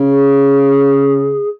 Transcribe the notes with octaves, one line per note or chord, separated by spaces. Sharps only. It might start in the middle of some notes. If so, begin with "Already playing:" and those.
Already playing: C#3
G#4